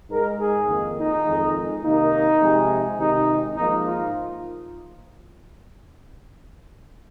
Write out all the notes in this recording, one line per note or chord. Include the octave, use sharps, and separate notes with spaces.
G#2 G#3 A#4
G#4
F2 D#3 A#3
D#4
F2 D#3 G#3
C3 D#3 A#3 D#4
C3 F3 G#3
C3 D#3 G#3 D#4
G#2 F3 A#3 D#4
F4